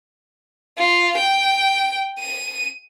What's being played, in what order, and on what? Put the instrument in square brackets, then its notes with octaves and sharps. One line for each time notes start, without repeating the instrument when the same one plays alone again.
[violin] F4
G5
D#7